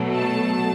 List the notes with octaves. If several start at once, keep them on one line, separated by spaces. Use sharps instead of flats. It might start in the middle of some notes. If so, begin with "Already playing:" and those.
Already playing: B2 F#3 A3
A5